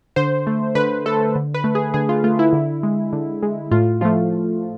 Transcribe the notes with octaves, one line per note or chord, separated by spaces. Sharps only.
D3 C5
A3
D3 B4
A3 A4
D3
B4
A3
G#4
D3 G#4
F4
A3 F4
E4
D3
G#3
D3
G#3
A2 F4
F3 A3 F4